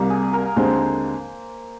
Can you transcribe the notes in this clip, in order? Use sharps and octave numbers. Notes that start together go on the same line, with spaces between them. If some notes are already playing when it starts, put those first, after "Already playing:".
Already playing: C2 C3 G3 A#3
G#4
A#4
D#2 D3 G#3 C4 C5